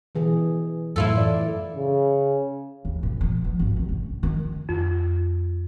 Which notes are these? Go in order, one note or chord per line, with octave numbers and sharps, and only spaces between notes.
B2 E3 G#4
F#2 A2 E4 F4 A4
E3 D5
C#3
D#2
A#2
F3
E3
G#1
C2
C#4
D#3
F2